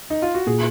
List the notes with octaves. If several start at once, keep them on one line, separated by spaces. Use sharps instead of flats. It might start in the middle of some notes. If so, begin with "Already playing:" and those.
D#4
F4
F#4
A#2 G#4